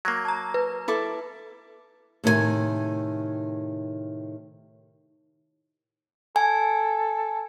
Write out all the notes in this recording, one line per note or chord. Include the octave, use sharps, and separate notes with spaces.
F#3 A#3 G#6 A#6
A5 A#5
B4
E4 A4 D6
A2 C3 D#3 A3 G4 G#5
A4 G#5